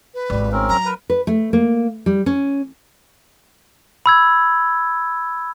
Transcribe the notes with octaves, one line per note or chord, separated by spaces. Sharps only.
B4
G#1 G3 A3
C4 C#4 A#4
F#3 A#5
A#4 B4
B4
A3
A#3
G3
C#4
B5 E6 G#6